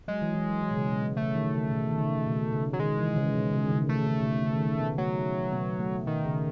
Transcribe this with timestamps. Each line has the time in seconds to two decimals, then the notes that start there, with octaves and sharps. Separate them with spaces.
0.08 F#3 G#3
0.22 E3
0.35 E3
0.49 F#3
0.63 E3
0.71 B2
0.76 C#3
0.89 B2
1.03 C#3
1.17 C#3 A3
1.35 D#3
1.53 C#3
1.72 B2
1.91 D#3
1.99 C#3
2.26 B2
2.53 C#3
2.73 F#3
2.80 D#3 G#3
2.98 E3
3.16 C#3
3.34 B2
3.53 C#3
3.65 D#3
3.71 C#3
3.89 C#3 A3
4.07 C#3
4.20 B2
4.25 C#3
4.43 C#3
4.56 D#3
4.62 C#3
4.80 B2 B3
4.98 F#3 A3
5.52 B2 B3
5.79 A3
6.06 B2 D#3
6.25 C#3